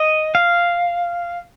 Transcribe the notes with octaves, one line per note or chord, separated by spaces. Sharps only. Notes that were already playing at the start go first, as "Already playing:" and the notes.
Already playing: D#5
F5